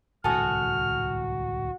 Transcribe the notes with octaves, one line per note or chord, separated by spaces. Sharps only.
D1 C2 G#2 F#4 A4 G#5 D#6 F6